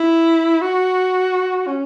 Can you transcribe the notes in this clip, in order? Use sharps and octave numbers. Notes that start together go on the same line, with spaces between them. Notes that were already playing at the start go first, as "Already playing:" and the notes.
Already playing: E4
F#4
C#4